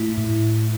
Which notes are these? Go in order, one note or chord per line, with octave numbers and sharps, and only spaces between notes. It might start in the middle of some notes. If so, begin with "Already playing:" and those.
Already playing: A2 A3 E4
A2